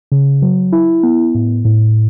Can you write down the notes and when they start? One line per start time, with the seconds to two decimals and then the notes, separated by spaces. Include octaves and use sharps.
0.12 C#3
0.42 F#3
0.72 E4
1.03 B3
1.35 A2
1.65 A2